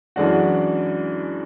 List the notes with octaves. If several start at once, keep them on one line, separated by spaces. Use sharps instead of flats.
F#2 E3 G#3 D4 F#4